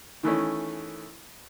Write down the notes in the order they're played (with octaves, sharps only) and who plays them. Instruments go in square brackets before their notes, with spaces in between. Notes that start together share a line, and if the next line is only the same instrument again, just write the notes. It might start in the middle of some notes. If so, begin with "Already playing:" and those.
[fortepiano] D#3 E3 A3 C#4